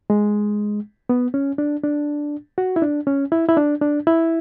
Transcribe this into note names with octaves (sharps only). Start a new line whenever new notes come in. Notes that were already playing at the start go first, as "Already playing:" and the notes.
G#3
B3
C#4
D4
D4
F#4
E4
D4
C#4
E4
E4
D4
D4
E4